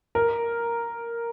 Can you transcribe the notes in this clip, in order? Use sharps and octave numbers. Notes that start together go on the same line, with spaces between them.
A#4